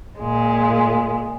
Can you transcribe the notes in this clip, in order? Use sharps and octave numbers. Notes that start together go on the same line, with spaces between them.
A#2 G#3